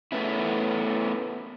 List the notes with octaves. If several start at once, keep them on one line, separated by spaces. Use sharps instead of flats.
A3 B3 C#4 E4